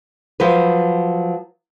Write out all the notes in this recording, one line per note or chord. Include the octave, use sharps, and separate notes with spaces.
F3 F#3 B4